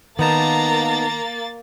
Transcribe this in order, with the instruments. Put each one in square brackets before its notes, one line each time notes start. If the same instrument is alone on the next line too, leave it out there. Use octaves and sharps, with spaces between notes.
[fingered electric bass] D#3 [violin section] A#3 A6 [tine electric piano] B3 D#4 A5 [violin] A#5